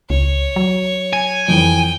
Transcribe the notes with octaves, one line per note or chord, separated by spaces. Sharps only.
C#2 C#5
F#3
G#5
F2 E3 G5